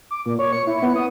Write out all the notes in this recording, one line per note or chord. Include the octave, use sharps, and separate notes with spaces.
D6
A#2
C#5
C#7
E4
B3
D#6